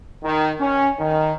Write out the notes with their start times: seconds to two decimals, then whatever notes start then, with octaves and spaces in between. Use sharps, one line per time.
0.24 D#3
0.59 C#4
0.99 D#3